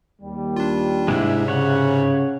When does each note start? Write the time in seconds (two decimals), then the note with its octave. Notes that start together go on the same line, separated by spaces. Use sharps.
0.22 D#2 G3
0.56 D4 F4
1.08 G#2 C3 G#3 D4 E4
1.48 C#3 C#5 F#5